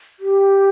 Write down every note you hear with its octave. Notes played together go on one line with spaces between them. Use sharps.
G4